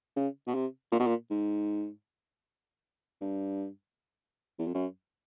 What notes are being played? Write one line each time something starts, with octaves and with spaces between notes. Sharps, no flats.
C#3
B2
C3
A#2
B2
A#2
G#2
G2
E2
F2
F#2